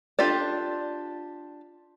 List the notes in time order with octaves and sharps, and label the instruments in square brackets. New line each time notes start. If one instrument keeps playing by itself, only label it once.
[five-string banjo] D4 F4 G4 A4 D5